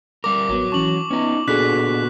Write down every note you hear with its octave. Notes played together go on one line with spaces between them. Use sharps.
G3 A#4 D6
A1 F#3 B3
E3 C#4 A5 C#6 F#7
B3 C#4 D#4
A#2 B3 D4 F#4 G#4 A4 F#6 B6